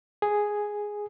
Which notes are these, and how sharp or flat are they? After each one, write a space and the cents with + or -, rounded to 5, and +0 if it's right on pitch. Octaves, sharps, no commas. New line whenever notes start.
G#4 +0